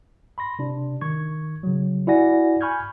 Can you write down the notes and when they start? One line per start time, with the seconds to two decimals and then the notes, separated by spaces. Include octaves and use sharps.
0.38 B5 C6 A#6
0.59 C3 D4
1.01 D#3 C#6 G#6
1.63 C#3 F#3
2.07 E4 F#4 D5 F#5 G#5 A#6
2.61 G#5 B5 C#6 F6 G6 G#6